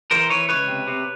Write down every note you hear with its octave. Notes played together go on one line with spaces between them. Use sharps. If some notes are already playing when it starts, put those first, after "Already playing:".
E3 A#4 C5
E3 B4 C#5
C#2 B4 C#5
C3
C3